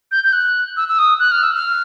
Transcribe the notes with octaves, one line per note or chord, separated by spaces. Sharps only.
G6
G6
F#6
E6
E6
D#6
F#6
F6
E6
F6